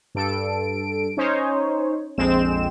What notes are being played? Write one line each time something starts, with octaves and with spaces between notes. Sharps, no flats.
G2 A4 D7
C#4 D#4 C5 C#5
A#1 F2 G#3 C4 E7